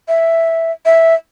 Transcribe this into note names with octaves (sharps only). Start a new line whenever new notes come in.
E5
E5